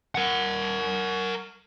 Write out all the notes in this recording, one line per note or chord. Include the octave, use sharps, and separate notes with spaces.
A#4 F#5